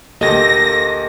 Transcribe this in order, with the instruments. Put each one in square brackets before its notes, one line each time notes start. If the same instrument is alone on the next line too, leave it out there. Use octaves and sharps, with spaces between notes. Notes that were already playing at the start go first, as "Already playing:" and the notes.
[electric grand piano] D2 D#5 [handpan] A#3 G4 A4 [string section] A#6